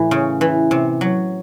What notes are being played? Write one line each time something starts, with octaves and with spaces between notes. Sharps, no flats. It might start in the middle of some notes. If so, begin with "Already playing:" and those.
Already playing: A2 E3
C#3
E3
C3
F#3